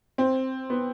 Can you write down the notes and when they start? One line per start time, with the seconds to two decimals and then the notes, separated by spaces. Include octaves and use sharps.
0.18 C4
0.70 B3